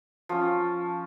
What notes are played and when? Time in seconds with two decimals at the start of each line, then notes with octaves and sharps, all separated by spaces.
0.29 F3 C#4